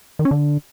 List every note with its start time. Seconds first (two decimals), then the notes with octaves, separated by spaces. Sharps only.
0.19 D#3
0.25 C#4
0.31 D3